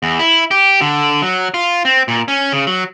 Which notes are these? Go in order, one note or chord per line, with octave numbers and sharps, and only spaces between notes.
E2
E4
G4
D3
F#3
F4
C4
A#2
C#4
C#3
F#3